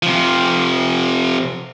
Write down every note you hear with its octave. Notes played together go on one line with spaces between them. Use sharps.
C3 F3